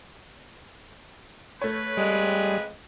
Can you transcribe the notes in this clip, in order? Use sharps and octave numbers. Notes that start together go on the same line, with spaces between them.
A3 B4 C#5
F2 G3 G#3